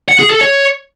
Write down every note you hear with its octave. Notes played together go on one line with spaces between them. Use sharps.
F#5
G#4
A4
C#5